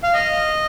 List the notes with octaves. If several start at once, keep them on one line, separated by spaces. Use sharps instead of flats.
F5
D#5